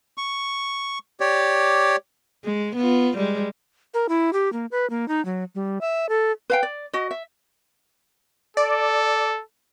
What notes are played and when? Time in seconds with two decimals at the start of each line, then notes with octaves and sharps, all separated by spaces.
0.18 C#6
1.20 G4 C#5 D5
2.44 G#3
2.76 B3 F4
3.17 G3 G#3
3.94 A#4
4.09 E4
4.33 G4
4.53 A#3
4.71 B4
4.90 A#3
5.08 D#4
5.25 F#3
5.55 G3
5.81 E5
6.09 A4
6.50 B4 F5 G5
6.63 D5
6.93 F#4 D#5
7.11 E5
8.57 A4 D5